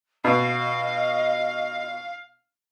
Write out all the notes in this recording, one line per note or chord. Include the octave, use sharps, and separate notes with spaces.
B2 D#5 F5